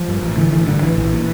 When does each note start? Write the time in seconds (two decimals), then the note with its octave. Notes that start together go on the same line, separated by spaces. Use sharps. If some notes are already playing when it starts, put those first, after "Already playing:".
Already playing: F3
0.08 G2
0.22 A1
0.37 D3 E3
0.52 A1 E3
0.67 G2 D3
0.82 A1 E3
0.98 A#1 E3
1.12 A#2